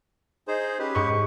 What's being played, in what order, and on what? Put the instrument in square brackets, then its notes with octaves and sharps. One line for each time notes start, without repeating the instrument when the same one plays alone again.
[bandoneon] D#4 G#4 C5
C#4 G4 B4
[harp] G#2 C#6